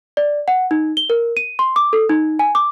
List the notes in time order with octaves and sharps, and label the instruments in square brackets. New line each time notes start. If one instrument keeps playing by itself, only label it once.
[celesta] D5
F#5
D#4
G7
A#4
D#7
C6
D6
A4
D#4
G#5
D6